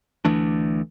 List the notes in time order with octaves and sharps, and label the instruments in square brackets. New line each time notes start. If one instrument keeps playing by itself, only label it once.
[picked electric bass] D2 E3 A3 D4